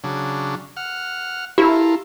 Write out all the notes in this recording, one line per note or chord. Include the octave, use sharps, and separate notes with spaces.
C#3 F#3 D4
F#5 F6
E4 F4 G4 A4 A#4